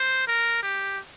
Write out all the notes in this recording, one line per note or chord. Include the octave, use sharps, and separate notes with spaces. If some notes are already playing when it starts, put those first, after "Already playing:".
Already playing: C5
A#4
G4